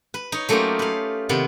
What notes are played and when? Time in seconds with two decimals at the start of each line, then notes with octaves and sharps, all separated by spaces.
0.14 B4
0.32 D#4 C#5
0.49 F#3 A3 A#3 C#4 F4 G4
0.79 B4 F5
1.29 C3 D#3 B3